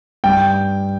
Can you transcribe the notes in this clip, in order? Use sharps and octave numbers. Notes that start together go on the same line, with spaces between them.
G2 G5